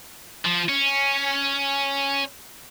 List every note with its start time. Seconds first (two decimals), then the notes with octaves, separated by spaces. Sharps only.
0.45 F3
0.69 C#4